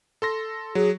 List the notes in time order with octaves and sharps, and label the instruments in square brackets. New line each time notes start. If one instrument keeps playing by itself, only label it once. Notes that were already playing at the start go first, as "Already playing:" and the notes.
[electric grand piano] A4 C6 A#6
[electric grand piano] F#3 [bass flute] G#4